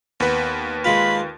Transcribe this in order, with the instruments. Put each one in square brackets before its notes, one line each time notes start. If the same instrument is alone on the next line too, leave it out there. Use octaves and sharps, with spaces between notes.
[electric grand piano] D#2 B4 [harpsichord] B3
[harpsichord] G#3 F4 [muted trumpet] B5